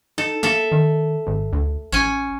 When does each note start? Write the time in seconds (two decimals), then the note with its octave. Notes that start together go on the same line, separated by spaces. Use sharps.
0.18 D#4 A4
0.43 A#3 A4 E5
0.72 D#3
1.27 G#1
1.53 D2
1.92 A1 C#4 G#5